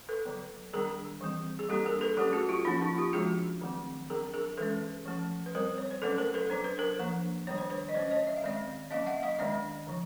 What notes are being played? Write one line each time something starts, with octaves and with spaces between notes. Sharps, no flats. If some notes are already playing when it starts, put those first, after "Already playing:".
A4 B4
D3 F#3 B3
D#3 G3 B3 D4 G#4 A#4
E3 G3 C4
G#4
G3 A#3 D4 G4 A4
G#4 A#4
A4 B4
F#3 A3 C#4 G4 A4
F#4 G#4
F4 G4
F3 A#3 C#4 D#4 F4
D#4 F4
F4 G4
F3 G#3 B3 D4 F#4 G#4
D#3 F#3 A3 C4
F#3 B3 D4 G#4 A#4
G#4 A#4
E3 G#3 C#4 A4 B4
F3 A3 C#4
B4
G3 C4 A#4 C5
C#5
C5
F#3 A3 C#4 A4 B4
A#4 C5
A4 B4
F#3 B3 D4 C5
B4
A#4 C5
F3 A#3 D4
D#3 G3 B3 D4 C#5
C5
B4 C#5
D#5
F#3 A3 C#4 C5 D5
C#5 D#5
E5
F5
D#3 G#3 C4 D5 E5
F#3 A#3 C#4 D#5 F5
E5 F#5
D#5 F5
D#3 G#3 B3 D4 D5 E5
D3 F3